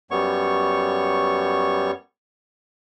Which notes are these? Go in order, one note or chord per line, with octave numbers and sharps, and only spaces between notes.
F#2 G3 B3 C#5 C#6